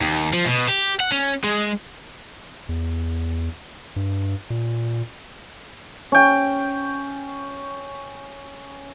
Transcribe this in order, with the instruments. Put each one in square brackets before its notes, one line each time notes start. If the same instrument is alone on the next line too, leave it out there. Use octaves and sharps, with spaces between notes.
[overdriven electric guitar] D#2
F3
B2
G4
F#5
C#4
G#3
[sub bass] E2
G2
A#2
[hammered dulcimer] C#4 G5